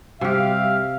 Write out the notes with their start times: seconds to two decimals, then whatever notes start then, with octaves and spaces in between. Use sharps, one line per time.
0.21 C3 G3 G4 E5 F5